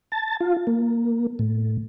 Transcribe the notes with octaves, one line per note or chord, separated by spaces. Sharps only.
A5
F4
A#3
A2